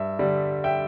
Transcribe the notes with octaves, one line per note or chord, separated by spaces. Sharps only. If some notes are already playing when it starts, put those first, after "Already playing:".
Already playing: G2 E5
D3 G3
E5 G5